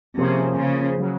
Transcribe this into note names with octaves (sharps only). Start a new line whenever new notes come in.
C3 F3 A#3 C#4 G#4 C5
C#3
C#3 F#3